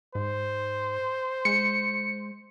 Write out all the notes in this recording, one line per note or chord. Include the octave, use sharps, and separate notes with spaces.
G#2 C5
G#3 C#7